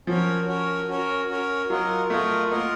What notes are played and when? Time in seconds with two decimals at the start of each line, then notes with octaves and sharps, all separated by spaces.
0.07 F3 C#4 F#4 A#4 C#5
0.48 C#4 F#4 A#4 C#5
0.89 C#4 F#4 A#4 C#5
1.30 C#4 F#4 A#4 C#5
1.70 F#3 F4 A#4 D#5 F#5
2.10 A3 F4 A#4 D#5 F#5
2.51 A#3 F4 A#4 D#5 F#5